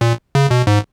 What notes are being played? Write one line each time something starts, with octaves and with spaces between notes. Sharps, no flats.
A#2
C#3
B2
G#2